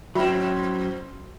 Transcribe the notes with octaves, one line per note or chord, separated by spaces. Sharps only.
G#2 F#3 C4 C#4 F#4 E5 B5